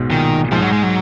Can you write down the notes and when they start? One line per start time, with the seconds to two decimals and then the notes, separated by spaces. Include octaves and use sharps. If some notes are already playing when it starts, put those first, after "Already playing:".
Already playing: B1 G#2 B2
0.10 A#2 D#3
0.52 G#2 F3
0.62 F#3
0.72 G#3
0.83 F#3